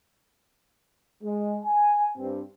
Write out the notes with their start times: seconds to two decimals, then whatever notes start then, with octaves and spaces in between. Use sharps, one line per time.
1.24 G#3
1.64 G#5
2.17 G2 C4